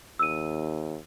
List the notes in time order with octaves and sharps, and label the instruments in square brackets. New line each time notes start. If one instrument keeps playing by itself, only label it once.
[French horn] D#2 [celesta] E6 D#7